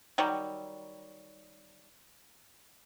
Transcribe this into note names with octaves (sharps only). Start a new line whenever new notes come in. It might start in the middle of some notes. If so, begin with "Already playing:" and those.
D#3 F#3 G3